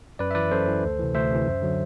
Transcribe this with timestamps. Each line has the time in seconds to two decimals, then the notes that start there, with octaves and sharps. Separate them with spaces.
0.19 F#2 B4 D5
0.31 E5
0.35 E3 B4 D5
0.51 F#2 A4 C5
0.67 E3
0.83 D2
0.99 C3 E3
1.15 D2 C5 E5
1.31 C3 E3
1.46 F#2
1.62 D3 F#3